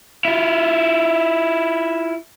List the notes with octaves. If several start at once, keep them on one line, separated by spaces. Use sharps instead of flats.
E4 F4